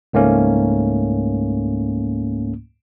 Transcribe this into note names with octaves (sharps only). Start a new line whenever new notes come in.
C#2 G#2 A3 A#3 C#4